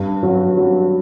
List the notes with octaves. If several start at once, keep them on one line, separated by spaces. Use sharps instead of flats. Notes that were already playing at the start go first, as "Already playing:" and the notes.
Already playing: G2
F#3
F#3